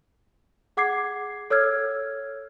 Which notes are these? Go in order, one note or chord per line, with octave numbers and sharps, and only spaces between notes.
G#4 F#5 D6 G#6 C7
A4 C#5 E6 F6 G#6